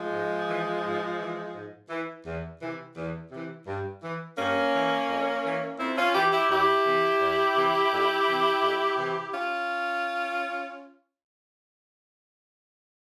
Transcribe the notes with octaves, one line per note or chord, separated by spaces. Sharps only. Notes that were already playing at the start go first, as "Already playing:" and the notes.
Already playing: F3 G#3
G#2
E3
G#2
E3
G#2
E3
E2
C3 E3
E2
C3 E3
G2
E3
G2 A#3 C#4
E3
F2
E3
F2 C4 E4
C#4 F4
E3 E4 G4
E4 G4
E2 E4 G4
C3 E3
E2
C3 E3
F2
C3 E3
F2
C3 E3
C#4 F4